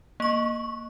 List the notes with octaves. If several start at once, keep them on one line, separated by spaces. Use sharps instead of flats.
A#3 C#6